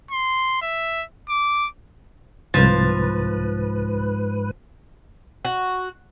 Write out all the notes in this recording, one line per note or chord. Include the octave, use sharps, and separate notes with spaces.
C6
E5
D6
C2 G#2 F3 B4 A6
F#4